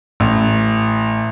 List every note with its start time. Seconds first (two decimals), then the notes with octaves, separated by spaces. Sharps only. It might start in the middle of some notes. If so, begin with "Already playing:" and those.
0.20 A1